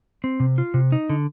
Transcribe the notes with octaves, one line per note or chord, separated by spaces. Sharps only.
C4
C3
F4
C3
D#4
D3